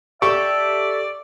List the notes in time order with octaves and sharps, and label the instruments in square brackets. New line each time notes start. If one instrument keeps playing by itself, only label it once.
[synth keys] G4 A4 [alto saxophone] D5 [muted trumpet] E5 [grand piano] C#6